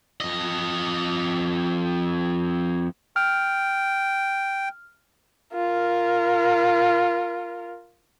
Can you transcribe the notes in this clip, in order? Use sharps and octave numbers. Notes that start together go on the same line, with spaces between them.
F2 D#5
G5 F6
F4 A#4